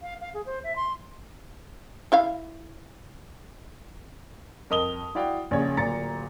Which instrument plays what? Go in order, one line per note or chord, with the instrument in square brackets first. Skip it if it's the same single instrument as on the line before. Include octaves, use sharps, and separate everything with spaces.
[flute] F5
F5
G#4
C5
E5
C6
[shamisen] E4 E5 F5
[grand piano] F2 A#4 D#5 D#6 F7 G7
E4 F#4 D5 F5 G5
A#1 C#3 G4 C#5
D1 A#2 A#5 A6 C#7